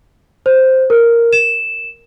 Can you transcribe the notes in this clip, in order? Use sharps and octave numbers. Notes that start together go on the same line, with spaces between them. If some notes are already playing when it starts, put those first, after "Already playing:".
C5
A#4
E7